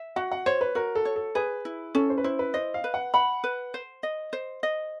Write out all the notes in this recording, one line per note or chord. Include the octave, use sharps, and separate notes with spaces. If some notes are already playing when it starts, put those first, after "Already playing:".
Already playing: E5
F#4 F#5
F#5
C5 C#5
B4
F#4 A#4
A4
C#5
A4
G#4 B4
E4
C#4 A4
C5
B4
E4 C5
B4
C5 D#5
F5
B4
F#5
F#5 B5
B4
C5
D#5
C5
D#5